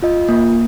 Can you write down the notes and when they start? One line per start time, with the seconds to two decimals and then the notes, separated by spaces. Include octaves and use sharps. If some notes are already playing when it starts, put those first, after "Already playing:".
0.03 F4 D#5
0.29 A#3